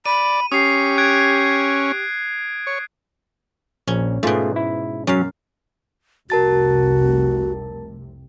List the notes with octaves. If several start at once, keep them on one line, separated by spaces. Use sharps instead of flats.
D5 B5 D#7
C#4 G4 D#6 C7
F#6 G#6 D7
C#5
A#1 C#4
G#2 B2 A3 F4 G#4
E4
F#2 F#3 C#4 C#5 F5
F1 C2 C3 F#4 A#4 A5 A6